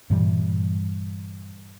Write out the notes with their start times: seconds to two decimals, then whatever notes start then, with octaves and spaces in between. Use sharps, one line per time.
0.10 G2 A#2 E3 G3